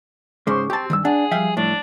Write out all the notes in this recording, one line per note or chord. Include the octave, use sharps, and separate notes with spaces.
G#2 C#3 G#3 C5 C#6 D6
C4 G4 A5
D2 G2 D#3 E6
D4 G#4 F#5
F3 G3 E5 F5 G5
A2 D4